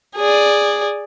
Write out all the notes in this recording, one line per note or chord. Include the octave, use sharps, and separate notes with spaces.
G#4 D5